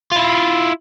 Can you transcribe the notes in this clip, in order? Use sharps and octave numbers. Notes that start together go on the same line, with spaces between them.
E4 F4